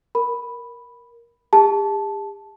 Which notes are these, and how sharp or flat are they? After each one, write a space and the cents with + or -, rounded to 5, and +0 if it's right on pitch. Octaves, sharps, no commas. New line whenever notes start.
A#4 +5 B5 +0
G4 +45 A5 -10